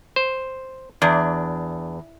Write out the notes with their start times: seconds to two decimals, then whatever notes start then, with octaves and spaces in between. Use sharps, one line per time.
0.16 C5
1.02 E2 D4